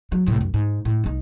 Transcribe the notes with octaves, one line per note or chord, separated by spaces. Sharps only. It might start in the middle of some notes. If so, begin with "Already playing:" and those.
F#3
C2 A2
F#2
G#2
A2
C2 D#4